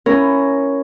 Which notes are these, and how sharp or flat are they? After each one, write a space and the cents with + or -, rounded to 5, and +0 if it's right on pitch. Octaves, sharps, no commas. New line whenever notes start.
C#4 +0 E4 +15 A#4 +0